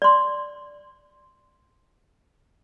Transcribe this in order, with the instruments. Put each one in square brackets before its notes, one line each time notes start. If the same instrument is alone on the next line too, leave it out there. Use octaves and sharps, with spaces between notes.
[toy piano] D5 C6